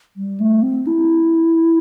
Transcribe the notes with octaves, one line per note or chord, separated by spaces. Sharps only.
G3
A3
C4
E4